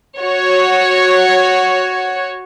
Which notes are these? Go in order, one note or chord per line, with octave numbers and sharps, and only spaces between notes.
F#4 C#5